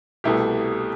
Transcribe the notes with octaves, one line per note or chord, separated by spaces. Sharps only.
C2 B2 A3 E4 G4